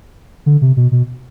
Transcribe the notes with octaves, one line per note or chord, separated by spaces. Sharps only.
D3
C3
B2
B2